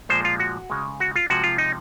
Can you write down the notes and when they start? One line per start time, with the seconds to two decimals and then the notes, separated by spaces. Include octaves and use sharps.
0.09 A#2 F3 G#3 C5
0.25 F4
0.40 F#4
0.70 C#3 G#3
1.00 F#4
1.16 F4
1.30 C3 F3 G#3 F#4
1.44 F4
1.58 D#4